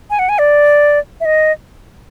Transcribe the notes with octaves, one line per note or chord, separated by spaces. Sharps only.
G#5
F#5
G#5
D5
E5
D#5